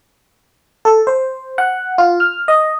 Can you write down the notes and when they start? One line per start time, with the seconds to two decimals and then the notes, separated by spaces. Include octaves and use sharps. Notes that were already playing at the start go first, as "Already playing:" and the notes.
0.85 A4
1.07 C5
1.58 F#5
1.98 F4
2.20 F6
2.48 D#5